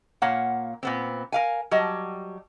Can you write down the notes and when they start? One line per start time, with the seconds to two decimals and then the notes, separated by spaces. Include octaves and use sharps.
0.22 A#2 A#3 C#5 F5 F#5
0.83 A#2 B3 C4
1.32 A#4 F5 G#5
1.71 F#3 G3 D#5 A5